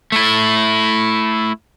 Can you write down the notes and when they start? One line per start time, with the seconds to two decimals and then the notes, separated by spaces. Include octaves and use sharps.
0.12 A3 E4